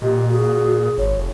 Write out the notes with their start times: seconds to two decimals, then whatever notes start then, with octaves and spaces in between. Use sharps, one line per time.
0.02 A#2 G4 D#5
0.30 F#4 G#4
0.98 G#1 C#5
1.17 F1